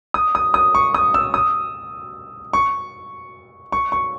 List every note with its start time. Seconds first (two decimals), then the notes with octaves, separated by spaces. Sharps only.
0.14 D#6
0.35 D#6
0.54 D#6
0.75 C#6
0.94 D#6
1.14 E6
1.34 D#6
2.53 C#6
3.72 C#6
3.92 C#6